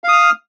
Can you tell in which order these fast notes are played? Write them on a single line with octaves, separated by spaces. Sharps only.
F5 D#6 F6